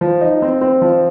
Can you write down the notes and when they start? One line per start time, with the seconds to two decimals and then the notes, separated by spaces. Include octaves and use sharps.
0.01 F3
0.21 D#4
0.42 C4
0.61 C4
0.82 F3